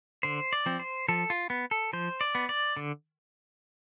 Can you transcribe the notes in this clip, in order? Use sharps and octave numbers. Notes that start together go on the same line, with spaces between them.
D3 C5
D5
F3 C4
C5
F3 A4
F4
B3
A4
F3 C5
D5
B3
D5
D3